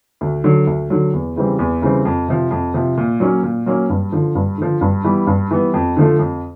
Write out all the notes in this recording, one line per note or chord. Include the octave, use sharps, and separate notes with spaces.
D2
D3 F#3
D2
D3 F#3
E2
C#3 E3 G3 C4
E2
C#3 E3 G3 C4
F2
C3 F3
F2
C3 F3
A#2
F#3 A#3 C#4
A#2
F#3 A#3 C#4
G2
D3 F3
G2
D3 F3
G2
E3 G3 B3
G2
E3 G3 B3
F2
D3 F3 A3
F2